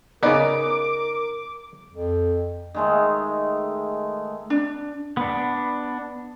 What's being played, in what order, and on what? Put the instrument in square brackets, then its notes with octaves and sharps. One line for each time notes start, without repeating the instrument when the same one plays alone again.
[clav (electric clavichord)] C#3 B3 [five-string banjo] D#4 D5 D#5 [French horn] A#4 [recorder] D6
[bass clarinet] F2
[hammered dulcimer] D#3 G#3 A3
[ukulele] D4
[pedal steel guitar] B3 D4